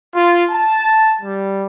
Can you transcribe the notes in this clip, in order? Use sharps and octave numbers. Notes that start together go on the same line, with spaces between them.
F4
A5
G3